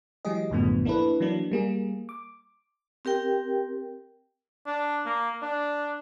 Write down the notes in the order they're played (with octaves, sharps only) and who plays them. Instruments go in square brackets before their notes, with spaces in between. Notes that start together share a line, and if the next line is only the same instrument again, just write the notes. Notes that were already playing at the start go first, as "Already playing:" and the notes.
[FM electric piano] E3 F#3 G#3 G4 G#4 D#5
B1 F#2 A2 D3 F3 B3
A#3 D4 E4 A4 B4
E3 F#3 A#3 D4
G3 A#3 G#4
D6
[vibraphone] C4 G4 A#4 G5
[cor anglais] D4
A#3
D4